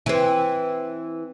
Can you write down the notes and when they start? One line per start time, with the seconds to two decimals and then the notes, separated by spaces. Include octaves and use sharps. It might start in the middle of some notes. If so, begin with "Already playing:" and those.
0.06 E3 C4